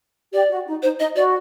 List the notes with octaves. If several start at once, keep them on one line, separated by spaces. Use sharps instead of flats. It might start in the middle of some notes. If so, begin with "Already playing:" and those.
G4 D5
F#4
D#4
D#4 C5
D#4 D#5
F#4 D5